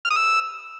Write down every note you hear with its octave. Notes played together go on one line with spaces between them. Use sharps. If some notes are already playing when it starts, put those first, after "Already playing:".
F6
D#6
E6